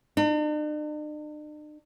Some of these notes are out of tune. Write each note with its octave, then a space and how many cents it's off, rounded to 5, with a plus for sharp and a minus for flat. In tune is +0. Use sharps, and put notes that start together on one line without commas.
D4 +45